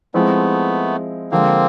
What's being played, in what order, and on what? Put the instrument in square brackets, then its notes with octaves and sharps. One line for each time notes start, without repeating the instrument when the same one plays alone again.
[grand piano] F3 G#3 C4 E4 [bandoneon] A3 B3
[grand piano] D3 F3 G#3 [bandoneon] A#3 C4